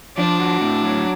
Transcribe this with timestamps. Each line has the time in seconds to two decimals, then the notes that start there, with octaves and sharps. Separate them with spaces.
0.17 F3 D4
0.39 F#4
0.61 A2
0.82 F#3